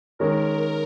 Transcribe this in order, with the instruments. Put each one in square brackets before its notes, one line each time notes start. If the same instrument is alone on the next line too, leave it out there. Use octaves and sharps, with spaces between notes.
[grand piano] D#3 G#3 C#4 [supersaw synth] A#4